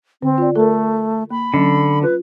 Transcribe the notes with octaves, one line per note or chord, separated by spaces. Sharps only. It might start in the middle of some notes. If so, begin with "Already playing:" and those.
D3 C4
F4 D5
A3 A4 A#4
A#3 B5
D3 F#3 C#4
F4 B4